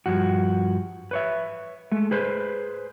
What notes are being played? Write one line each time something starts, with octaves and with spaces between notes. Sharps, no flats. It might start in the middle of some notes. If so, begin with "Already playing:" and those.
G2 F3 F#4
B4 C#5 E5
G#3 A3
G#4 B4 C5